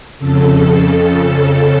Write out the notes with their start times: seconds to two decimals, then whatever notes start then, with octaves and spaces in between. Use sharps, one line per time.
0.19 F2 C#3 A4